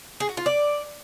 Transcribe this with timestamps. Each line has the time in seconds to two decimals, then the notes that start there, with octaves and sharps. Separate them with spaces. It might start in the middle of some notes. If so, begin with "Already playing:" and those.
0.20 G#4
0.29 F#4
0.37 F4
0.46 D5